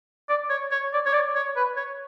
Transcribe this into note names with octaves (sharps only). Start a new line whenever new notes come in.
D5
C#5
C#5
D5
C#5
D5
C#5
B4
C#5